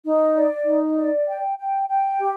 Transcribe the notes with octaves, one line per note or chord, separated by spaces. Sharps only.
D#4
D5
D#4
D5
G5
G5
G5
G4